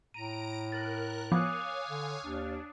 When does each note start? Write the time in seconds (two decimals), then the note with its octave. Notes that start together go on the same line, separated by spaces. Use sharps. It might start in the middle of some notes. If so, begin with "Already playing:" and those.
0.14 A2 A#5 D7 D#7
0.72 A#4 F#6 A6
1.32 F3 B3 C#5 F5 G#5 D6 D#6 F#6
1.88 D3
2.23 D#2 D4